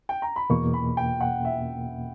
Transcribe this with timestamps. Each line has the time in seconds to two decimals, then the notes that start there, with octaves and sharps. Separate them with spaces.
0.09 G5
0.22 A#5
0.36 B5
0.50 E2 B2 A#3 C#6
0.74 B5
0.97 G5
1.21 F#5
1.45 E5